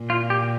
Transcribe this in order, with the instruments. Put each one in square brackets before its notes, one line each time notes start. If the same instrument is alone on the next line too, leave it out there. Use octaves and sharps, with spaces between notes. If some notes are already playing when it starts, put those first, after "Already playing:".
Already playing: [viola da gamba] A#2
[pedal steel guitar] F4
G4